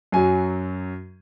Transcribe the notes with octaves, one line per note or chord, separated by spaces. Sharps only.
F#2 F#3 G#5